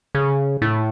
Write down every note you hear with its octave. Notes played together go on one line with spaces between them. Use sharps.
C#3
A2